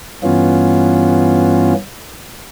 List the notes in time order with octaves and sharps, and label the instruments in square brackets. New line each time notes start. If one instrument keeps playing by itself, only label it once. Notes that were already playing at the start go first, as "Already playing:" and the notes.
[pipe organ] G2 E3 B3 C#4 F4